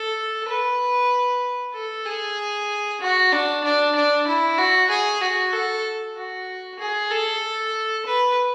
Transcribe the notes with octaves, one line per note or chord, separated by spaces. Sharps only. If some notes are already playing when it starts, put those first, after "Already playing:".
Already playing: A4
B4
A4
G#4
F#4
D4
D4
D4
E4
F#4
G#4
F#4
A4
F#4
G#4
A4
B4